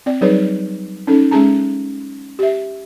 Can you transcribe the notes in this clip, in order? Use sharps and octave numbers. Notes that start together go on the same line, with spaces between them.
C4 D5
F#3 G3 D#4 G#4 B4 C#5
C#4 D#4 A4
G#3 C#4 G#4 A5 A#5
G4 E5